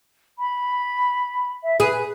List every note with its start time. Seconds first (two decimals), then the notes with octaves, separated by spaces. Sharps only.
0.38 B5
1.63 E5
1.80 G#4 B4